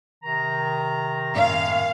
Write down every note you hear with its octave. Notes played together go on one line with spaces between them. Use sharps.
C3 D#3 A#5
F#2 D#3 F5